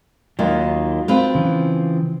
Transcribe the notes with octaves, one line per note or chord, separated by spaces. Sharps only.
D#2 D#3 F#3 F4
C4 B4 F5
C#3 E3 F3